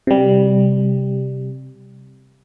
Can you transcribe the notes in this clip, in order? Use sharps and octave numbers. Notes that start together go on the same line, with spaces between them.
C3 G3